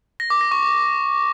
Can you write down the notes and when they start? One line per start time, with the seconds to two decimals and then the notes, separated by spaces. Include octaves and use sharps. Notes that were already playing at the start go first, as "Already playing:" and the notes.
0.20 A#6
0.30 D6
0.41 A#6
0.51 C#6